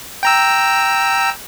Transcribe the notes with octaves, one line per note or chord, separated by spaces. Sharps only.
G5 A#5 E6